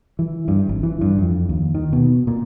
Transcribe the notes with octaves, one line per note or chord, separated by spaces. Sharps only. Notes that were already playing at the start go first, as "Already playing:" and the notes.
E3
G2
G#1
E3
G2
F2
D#2
D#3
B2
A#2